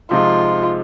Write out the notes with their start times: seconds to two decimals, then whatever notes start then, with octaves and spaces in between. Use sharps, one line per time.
0.11 C3 F3 G#3 D#4 F4